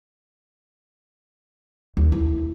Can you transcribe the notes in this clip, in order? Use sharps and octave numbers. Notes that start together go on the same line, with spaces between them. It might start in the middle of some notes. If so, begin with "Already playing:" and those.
D#2
E4